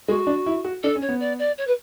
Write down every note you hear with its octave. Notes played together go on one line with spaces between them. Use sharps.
G#3 F#4
D4
E4
F#4
D4 A4
C#4
C#5
B3
D5
D5
C#5
B4